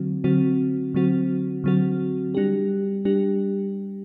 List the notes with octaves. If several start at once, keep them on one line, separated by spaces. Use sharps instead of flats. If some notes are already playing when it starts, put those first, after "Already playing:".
Already playing: D3 F#3 C4 F#4
D3 F#3 C4 F#4
D3 F#3 C4 F#4
D3 F#3 C4 F#4
G3 D4 G4
G3 D4 G4